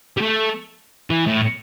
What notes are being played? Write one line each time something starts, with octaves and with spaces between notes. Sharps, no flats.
G3
A3
E3
A2